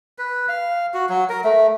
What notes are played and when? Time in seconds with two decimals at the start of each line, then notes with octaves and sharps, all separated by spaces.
0.18 B4
0.49 F5
0.94 F#4
1.09 F#3
1.29 A#4
1.44 A3